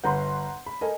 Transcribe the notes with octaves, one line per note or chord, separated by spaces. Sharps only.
G1 B4 F#5 A#5 C6 G6
B5
A4 A#4 D#5 G#5